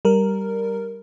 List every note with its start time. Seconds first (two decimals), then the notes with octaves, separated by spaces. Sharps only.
0.05 G3 A#4